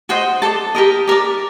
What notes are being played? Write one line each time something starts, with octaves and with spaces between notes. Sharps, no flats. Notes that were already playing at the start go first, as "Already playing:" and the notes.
F#4 C5 D#5 G5
A4 D5 A5
G4 A#4 D#5
G4 A#4 D5